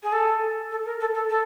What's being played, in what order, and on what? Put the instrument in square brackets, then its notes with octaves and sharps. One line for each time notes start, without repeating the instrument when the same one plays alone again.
[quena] G#4
A4
A4
A#4
A4
A4
A4